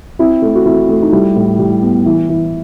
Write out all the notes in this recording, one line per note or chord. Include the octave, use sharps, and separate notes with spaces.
C4 E4
A3
F#4
C4 E4
A3
D#4
G3 E4
A2
G3
B3
E3
E3